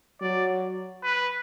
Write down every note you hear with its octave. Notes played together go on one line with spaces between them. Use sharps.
F#3 D5
B4